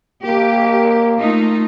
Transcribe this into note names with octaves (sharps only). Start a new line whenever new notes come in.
A#3 G4
A3 D#4 F4